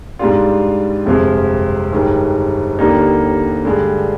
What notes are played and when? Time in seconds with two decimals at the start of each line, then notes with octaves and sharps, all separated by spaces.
0.19 G#2 G3 D4 F4
1.05 G1 F2 C3 F3 G#3
1.93 G1 G2 D#3 G#3
2.79 D#2 D3 G3 A#3 D#4
3.65 G2 D3 G#3